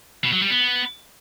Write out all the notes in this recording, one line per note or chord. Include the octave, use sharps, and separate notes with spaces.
B2
F#3
G3
B3